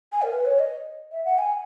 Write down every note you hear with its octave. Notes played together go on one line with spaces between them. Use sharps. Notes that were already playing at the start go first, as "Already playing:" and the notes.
G#5
A#4
B4
C#5
D#5
E5
F#5
G#5